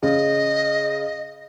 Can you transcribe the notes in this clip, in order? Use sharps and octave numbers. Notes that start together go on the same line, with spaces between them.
C#3 D#5